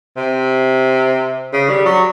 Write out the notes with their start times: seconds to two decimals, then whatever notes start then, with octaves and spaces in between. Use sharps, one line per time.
0.17 C3
1.53 C#3
1.69 G3
1.86 F#3